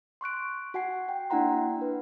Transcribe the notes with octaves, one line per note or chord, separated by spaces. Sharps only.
C6 C#6 F#6 D7
F#4 F#5 G#5 C7
G5
A#3 D4 E4 F#5 A#5 C6
B4